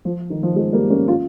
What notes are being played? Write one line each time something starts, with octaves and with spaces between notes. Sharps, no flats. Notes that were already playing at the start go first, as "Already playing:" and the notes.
F3
D#3
F3
F3 G#3
G3 A#3
A#3 C#4
C#4 F4